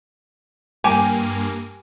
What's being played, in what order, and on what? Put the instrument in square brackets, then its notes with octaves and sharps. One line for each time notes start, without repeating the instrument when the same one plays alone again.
[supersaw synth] G2 A#3 [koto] G4 [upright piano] G#5